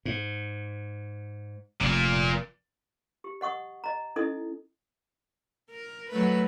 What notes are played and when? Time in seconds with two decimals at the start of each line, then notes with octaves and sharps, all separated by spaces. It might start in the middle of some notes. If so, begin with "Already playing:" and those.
0.05 G#2
1.81 F1 A#2 A#3
3.24 G4
3.41 D#5 F#5 C#6 D#6
3.84 D#5 A#5
4.16 C#4 D#4 E4 A4 D#5 D#6
5.70 A#4
6.10 F#3 A3 B4